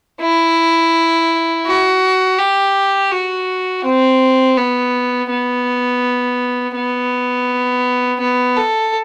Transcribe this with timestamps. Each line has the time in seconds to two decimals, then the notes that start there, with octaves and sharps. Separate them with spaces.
0.21 E4
1.66 F#4
2.38 G4
3.12 F#4
3.84 C4
4.57 B3
5.30 B3
6.75 B3
8.20 B3
8.57 A4